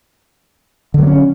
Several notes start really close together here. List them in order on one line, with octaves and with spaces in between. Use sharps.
D3 F#3 A#3 C#4